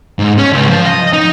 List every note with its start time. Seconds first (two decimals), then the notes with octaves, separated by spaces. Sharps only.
0.19 G#2
0.38 C#4
0.53 C#2
0.70 F3
0.86 D#5
1.13 D#4